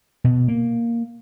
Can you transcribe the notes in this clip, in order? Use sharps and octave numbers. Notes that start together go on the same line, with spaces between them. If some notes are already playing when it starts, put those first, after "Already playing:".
B2
A#3